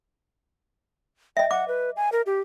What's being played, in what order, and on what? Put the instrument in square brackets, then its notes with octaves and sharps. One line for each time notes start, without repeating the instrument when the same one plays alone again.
[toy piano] D#5 E5 [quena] G5
[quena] F#5 [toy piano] D6
[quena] B4
G#5
A#4
G4